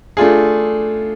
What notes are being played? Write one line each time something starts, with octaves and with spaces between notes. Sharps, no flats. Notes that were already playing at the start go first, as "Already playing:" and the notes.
A3 D4 F4 G#4